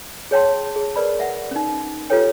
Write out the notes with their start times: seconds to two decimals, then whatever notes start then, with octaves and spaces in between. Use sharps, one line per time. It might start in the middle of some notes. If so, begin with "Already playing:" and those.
0.31 G#4 C#5 G5 A5 C6
0.76 G#4
0.96 A#4 B4 D5 B5
1.20 E5 F#5
1.51 C#4 D#4
2.10 F4 G4 A4 B4 C#5 G5